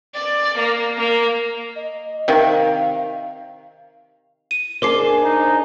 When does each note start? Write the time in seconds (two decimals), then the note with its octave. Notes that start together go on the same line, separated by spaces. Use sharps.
0.15 D5
0.58 A#3
0.98 A#3
1.76 D#5
2.28 C3 D#3 F5
4.51 D#7
4.82 D4 G#4 A#4 C5 D6 C7
5.23 D#4